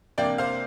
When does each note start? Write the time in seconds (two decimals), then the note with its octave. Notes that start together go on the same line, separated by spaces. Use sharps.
0.18 C3 A#3 D4 D5 G5
0.38 C5 F5